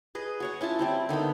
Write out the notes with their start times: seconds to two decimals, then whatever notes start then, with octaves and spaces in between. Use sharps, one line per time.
0.15 G#4 B4 D#5
0.40 F#4 C#5 F#5
0.61 C#4 E4 F4 A5
0.79 G3 C4 E4
1.09 D3 D#3 B3 B5